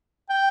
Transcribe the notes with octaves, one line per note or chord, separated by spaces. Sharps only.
G5